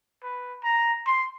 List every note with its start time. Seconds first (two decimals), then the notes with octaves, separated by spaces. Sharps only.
0.23 B4
0.64 A#5
1.07 C6